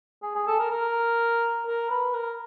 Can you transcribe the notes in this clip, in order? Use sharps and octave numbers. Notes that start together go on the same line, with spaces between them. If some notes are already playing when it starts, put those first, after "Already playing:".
G#4
G#4
A4
A#4
A#4
A#4
B4
A#4